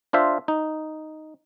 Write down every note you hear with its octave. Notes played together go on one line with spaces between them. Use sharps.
D4 F4 C5 E5
D#4